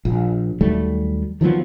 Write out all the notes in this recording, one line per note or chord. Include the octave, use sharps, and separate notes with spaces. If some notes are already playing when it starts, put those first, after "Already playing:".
A#1
D#2 F#3 G3 A3
D#3 F3 F#3 B3